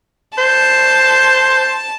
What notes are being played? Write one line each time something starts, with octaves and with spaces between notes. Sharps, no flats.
C5 A5